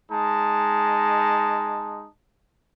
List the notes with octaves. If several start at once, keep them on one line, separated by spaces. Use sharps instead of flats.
G#3 D#4 A5